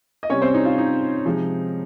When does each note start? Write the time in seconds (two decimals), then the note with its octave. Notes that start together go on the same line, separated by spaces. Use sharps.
0.23 D#5
0.30 C3 G3 C#4 C#5
0.42 C4 C5
0.54 D#4
0.65 F4
0.78 D#4
1.26 C3 F3 G#3